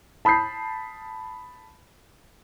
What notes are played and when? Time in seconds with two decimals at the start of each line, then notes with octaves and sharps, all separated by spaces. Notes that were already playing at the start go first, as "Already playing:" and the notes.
0.25 A5 B5 D#6 G6 C7